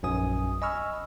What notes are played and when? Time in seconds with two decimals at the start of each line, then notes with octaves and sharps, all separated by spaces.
0.03 A#1 F#2 G#5 D#6
0.62 D#5 G#5 B5 C#6 E6 F6